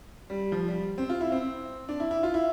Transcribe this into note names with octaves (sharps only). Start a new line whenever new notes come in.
G3
F3
G3
C4
F4
E4
C4
D4
E4
E4
F4
E4